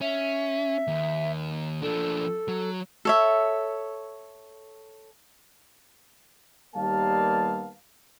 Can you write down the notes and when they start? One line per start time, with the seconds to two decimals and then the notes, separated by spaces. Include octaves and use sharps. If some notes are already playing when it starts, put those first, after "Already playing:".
0.01 C#4 E5
0.87 D#2
1.82 F3 D4 A4
2.48 F#3
3.05 A4 C#5 E5
6.75 D#2 G3 A#3 B3 F5 A5